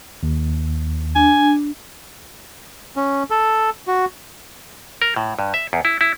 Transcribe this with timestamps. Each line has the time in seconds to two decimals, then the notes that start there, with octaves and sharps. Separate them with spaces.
0.23 D#2
1.16 D4 G#5
2.96 C#4
3.30 A4
3.87 F#4
5.02 A#4
5.16 A2
5.39 G2
5.54 E5
5.73 E2
5.85 E4
6.01 E4